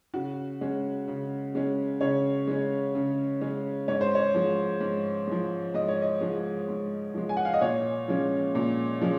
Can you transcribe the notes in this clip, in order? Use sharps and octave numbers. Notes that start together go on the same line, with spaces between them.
C#3 F#4
G#3 C#4
C#3
G#3 C#4
C#3 C#5
G#3 C#4
C#3
G#3 C#4
G#2 C#5
C5
C#5
F3 G#3
G#2
F3 G#3
G#2 D#5
C#5
D#5
F3 G#3
G#2
F3 G#3
G#5
F#5
F5
D#5
A#2 C#5
F3 G#3 C#4
A#2
F3 G#3 C#4